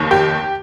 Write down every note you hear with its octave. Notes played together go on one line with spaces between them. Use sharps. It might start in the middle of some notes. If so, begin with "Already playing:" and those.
Already playing: F1 D#2 D#3
G4